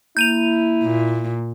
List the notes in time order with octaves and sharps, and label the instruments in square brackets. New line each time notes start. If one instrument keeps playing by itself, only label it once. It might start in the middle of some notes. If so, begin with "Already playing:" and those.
[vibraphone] A#3 [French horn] E4 [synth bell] G6 D#7 F7
[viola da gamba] A#2